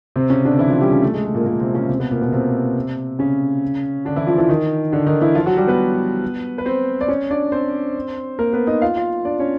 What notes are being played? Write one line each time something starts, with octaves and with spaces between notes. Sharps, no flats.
C3 C4
C#3 C#4
D3 D4
E3 E4
F3 F4
G3 G4
C#3 C#4
A3
G#3
A3
A#2 A#3
A#2 A#3
C3 C4
C#3 C#4
C3 C4
B2 B3
A#2 A#3
B2 B3
C3 C4
C#3 C#4
D3 D4
E3 E4
F3 F4
E3 E4
D#3 D#4
D3 D4
D#3 D#4
E3 E4
F3 F4
F#3 F#4
G3 G4
B3 B4
B4
C4 C5
D5
C#4 C#5
D4 D5
C4 C5
A#3 A#4
B3 B4
D#4 D#5
F4 F5
F4 F5
D4 D5
C#4 C#5